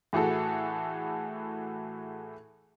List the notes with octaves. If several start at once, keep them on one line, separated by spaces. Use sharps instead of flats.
A2 E3 F#4 G#4 A4